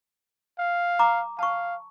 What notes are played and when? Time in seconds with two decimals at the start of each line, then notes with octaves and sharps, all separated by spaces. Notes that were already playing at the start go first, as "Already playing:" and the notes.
0.59 F5
0.99 A#5 D6
1.39 F5 A5 C#6